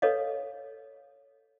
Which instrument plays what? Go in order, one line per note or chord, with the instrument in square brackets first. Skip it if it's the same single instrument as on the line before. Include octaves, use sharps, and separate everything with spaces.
[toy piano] A4 B4 C#5 D#5 F5